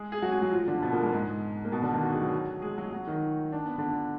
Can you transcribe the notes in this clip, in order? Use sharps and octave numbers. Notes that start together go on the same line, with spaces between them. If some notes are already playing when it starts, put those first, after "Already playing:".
Already playing: G#3 G#4
G#4
F#3 F#4
G#3 G#4
F#3 F#4
F3 F4
D3 D4
B2 B3
A#2 A#3
G#2 G#3
G#2 G#3
A#3
B2 B3
D3 D4
D#3 D#4
F#4
G#4
F#3 F#4
G#3 G#4
F#3 F#4
F#3 F#4
D#3 D#4
D4
B3
D3 D4